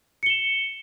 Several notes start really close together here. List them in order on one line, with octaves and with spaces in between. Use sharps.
C#7 G7 E7